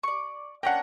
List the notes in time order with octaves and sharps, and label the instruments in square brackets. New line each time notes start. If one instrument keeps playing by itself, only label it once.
[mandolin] D5 C#6
[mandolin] A#3 C#4 D4 [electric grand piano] F#5 G5